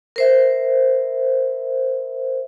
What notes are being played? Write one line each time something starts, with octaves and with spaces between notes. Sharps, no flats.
A#4 C5 E5